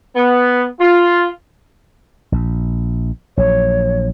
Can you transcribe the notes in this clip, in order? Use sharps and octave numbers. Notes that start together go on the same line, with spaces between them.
B3
F4
A#1
A#1 F#3 C#5